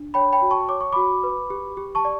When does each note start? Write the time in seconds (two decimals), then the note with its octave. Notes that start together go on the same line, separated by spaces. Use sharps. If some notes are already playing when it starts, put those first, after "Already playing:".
Already playing: D4
0.14 C#5 G5 B5
0.32 G5 B5
0.42 F#4
0.50 A5 C#6
0.69 C#5 D6
0.81 C#6
0.93 F#4 B5 D6
1.23 B4
1.50 G4
1.77 G4
1.95 A5 C#6
2.05 D5